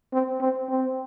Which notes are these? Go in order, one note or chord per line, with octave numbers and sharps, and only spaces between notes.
C4
C4
C4